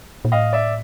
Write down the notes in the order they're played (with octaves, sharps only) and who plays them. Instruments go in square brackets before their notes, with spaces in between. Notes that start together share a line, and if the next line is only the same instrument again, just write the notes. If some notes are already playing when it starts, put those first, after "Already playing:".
[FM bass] A#2
[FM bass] A2 [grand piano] D#5 F5
[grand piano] D5 E5